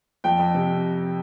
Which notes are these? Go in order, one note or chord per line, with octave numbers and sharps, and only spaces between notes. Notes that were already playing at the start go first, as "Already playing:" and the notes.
F2 G5
F2
C3